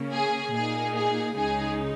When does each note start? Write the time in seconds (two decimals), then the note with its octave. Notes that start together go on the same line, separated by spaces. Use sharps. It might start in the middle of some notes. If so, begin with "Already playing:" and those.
Already playing: C#3 A#3 C#4
0.13 G#4
0.54 A#2 A#3 D#4 G#4
0.95 G#4
1.36 C#2 C#3 G#3 D#4 G#4